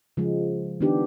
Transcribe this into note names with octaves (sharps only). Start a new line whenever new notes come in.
C#3 F3 G#3
D#3 G#3 B3 D4 G4